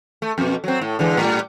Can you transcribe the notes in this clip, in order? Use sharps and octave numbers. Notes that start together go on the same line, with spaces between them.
A3
F2 B2
F#3 C4
A2
D3 E3 G#3
A2 G3